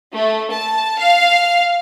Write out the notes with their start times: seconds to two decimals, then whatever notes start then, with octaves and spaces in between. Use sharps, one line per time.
0.14 A3
0.52 A5
0.99 F5